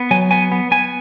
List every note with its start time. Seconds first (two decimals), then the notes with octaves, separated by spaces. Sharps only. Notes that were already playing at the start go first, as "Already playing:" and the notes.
Already playing: B3
0.11 F#3 G#5
0.31 B3 G#5
0.52 B3
0.71 B3 G#5